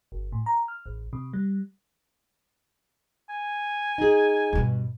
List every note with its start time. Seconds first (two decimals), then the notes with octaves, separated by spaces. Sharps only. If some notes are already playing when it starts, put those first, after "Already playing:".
0.12 G1
0.32 A2
0.46 A#5
0.68 F6
0.86 A1
1.13 C3
1.33 G3
3.29 G#5
3.98 D#4 G#4
4.53 G2 B2